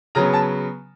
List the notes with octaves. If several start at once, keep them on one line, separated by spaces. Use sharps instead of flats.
C#3 F#3 B3 A#5
A5